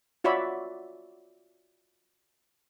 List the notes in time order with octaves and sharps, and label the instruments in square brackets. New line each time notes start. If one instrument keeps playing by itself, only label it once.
[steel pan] F4 F#4 C#5 D5 E5 B5